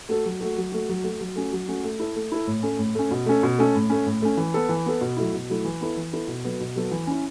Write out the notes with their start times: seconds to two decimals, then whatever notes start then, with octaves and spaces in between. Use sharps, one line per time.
0.09 A3 F#4 A4
0.25 F#3
0.40 A3 F#4 A4
0.57 F#3
0.72 A3 F#4
0.89 F#3
1.04 A3 F#4
1.21 F#3
1.36 A3 C#4 F#4
1.52 F#3
1.68 A3 C#4 F#4
1.84 A3
1.99 E4 A4
2.16 A3
2.32 E4 A4
2.47 A2
2.63 A3 C#4
2.78 A2
2.95 A3 C#4
3.11 B2
3.26 A3 C#4 A4
3.43 B2
3.58 A3 C#4 A4
3.75 A2
3.90 A3 C#4
4.06 A2
4.22 A3 C#4
4.37 E3
4.54 B3 A4
4.69 E3
4.86 B3 A4
5.01 B2
5.17 F#3 A3 E4
5.33 B2
5.50 F#3 A3 E4
5.64 E3
5.81 B3 E4 A4
5.97 E3
6.13 B3 E4 A4
6.28 B2
6.45 F#3 B3 A4
6.60 B2
6.76 F#3 B3 A4
6.91 E3
7.07 C#4 E4